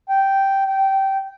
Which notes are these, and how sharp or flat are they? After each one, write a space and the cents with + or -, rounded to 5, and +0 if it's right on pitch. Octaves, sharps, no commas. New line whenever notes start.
G5 -5
G5 -15